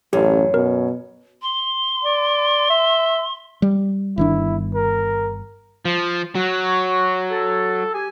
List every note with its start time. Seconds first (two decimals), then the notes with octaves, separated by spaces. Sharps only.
0.13 A1 F#2 G4
0.54 B2 A#4
1.42 C6
2.03 D5
2.70 E5
3.62 G3
4.18 G1 D#3 D4 E4
4.74 A#4
5.85 F3
6.35 F#3 F#4
7.30 A4
7.93 G4 G#5